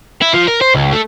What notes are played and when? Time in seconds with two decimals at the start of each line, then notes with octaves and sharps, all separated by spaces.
0.22 E4
0.34 F3
0.48 A#4
0.61 C5
0.74 C#2
0.93 A3